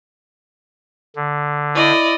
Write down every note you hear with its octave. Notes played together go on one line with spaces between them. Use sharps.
D3
E4 D5 D#5